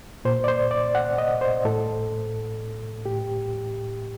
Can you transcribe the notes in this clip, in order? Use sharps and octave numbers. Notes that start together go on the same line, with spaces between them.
A#2 C5
D5
C5
D5
F#5
D#5
C5
A2 A4
A2 G4